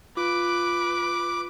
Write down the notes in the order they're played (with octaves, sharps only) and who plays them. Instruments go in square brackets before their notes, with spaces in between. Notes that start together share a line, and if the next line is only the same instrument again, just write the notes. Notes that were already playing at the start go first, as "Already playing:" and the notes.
[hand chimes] F4 [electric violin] B4 D7 [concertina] D6